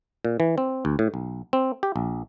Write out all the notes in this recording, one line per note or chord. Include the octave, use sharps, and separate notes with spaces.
A#2
E3
C4
D2
A2
B1
C4
G4
A#1